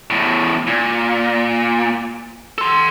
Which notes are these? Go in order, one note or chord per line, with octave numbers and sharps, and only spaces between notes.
E2 A2
A#2
A4 C6